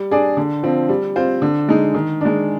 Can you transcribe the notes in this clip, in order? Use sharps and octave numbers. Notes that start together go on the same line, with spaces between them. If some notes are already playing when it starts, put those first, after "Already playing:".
Already playing: G3
D4 G#4 D5
D3
F3 C4
G3
C4 F4 C5
D3
G#3 D#4
D#3
G#3 D4